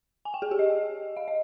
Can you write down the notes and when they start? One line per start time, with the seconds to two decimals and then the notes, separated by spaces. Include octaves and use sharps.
0.25 G#5
0.34 G5
0.42 G#4
0.51 G4
0.59 D#5
1.17 F5
1.28 D#5